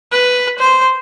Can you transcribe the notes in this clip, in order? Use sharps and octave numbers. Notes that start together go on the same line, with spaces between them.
B4
C5